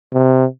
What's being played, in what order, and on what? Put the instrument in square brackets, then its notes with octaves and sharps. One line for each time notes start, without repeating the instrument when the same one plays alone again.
[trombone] C3